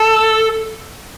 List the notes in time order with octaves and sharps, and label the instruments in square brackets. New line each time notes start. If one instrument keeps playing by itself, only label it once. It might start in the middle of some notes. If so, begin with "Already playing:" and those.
Already playing: [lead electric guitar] A4